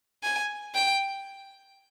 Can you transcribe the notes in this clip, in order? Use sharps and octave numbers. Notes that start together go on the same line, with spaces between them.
G#5
G5